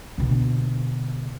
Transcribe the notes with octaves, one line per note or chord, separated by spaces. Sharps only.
B2 D3